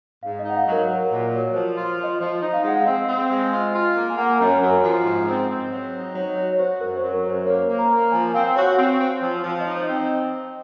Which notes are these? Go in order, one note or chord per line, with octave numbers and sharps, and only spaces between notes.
G#2 F5
D#5
D#4
F#5
F5
F#3
A#4
F#3
A#2
F#3
F3 C5
F4
F3 D#5
F3 D#5
D#4
F5
G#3 F#5
C4 F5
C4
G#3
F4
F4
A#3
G#5
A#3 F#5
A#5
F#2
G#5
F#2
F3
G#2
C4
C4
F#3
D#4
F#3 C#5
F#4 C#5
C#5
F#4 C5
F#2 A#4
C5
F#3
A#4
F#2
C5
A#3 C#5
A#3
A#5
A#3
F3 G#5
C4 F5
F#4 C#5
C4
C4
F3
F3 C5
D#5
D#4
C5
C4